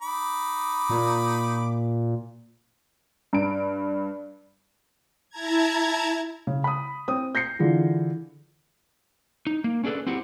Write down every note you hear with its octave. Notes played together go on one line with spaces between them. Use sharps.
D#4 B5 D6
A#2
G2 D7
E4 A5 A#5 G#6
C#3
B5 D#6
C4 D#6
G6 A#6 C7 C#7
D3 E3 F4 G#4
D#4
A#3
C#4 D4 G#4 A4 B4
C4 E4 F#4 G4